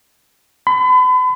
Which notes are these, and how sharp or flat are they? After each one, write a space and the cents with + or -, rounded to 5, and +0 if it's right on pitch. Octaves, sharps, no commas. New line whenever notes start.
B5 +40